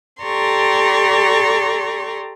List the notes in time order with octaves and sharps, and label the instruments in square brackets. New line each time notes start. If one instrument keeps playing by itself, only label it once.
[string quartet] G4 A4 D5 A#5 C6 C#6